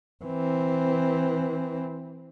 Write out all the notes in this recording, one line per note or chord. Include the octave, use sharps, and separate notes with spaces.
E3 C4